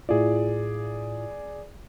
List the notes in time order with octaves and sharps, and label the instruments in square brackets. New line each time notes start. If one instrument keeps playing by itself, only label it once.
[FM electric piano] A2 E4 F4 [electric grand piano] G#4 D5